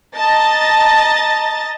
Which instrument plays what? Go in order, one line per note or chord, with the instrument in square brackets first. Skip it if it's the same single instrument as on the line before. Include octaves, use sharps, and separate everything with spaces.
[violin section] D#5 A5 A#5 A6